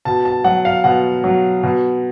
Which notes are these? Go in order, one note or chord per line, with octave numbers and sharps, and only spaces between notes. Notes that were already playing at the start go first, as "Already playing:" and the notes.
B2 A5
A5
F#3 F#5
F5
B2 F#5
F#3
B2